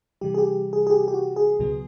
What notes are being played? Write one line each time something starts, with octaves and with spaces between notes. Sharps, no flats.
C3 E3 G3 G4
G#4
G4
G#4
G#4
G4
G4
F#4
G#4
C#2 B2 F#3 B3